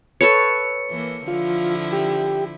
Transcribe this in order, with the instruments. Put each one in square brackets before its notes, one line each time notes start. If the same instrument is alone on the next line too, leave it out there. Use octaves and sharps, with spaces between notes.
[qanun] A4 B4 C#5 [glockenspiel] C#7
[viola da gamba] E3 A#3
[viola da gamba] D3 F3 E4 [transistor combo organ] F4
[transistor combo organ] G4